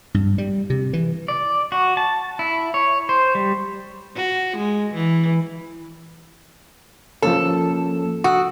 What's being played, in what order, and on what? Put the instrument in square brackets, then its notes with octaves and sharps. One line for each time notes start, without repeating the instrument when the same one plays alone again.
[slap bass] G2
G3
C3
E3
[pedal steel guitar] D5
F#4
A5
E4
C#5
C5
G3
[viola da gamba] F#4
G#3
E3
[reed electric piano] F3 A#3 C#4 [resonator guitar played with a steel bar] A4
[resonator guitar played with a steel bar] F#4 [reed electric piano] C#6 D#6 E6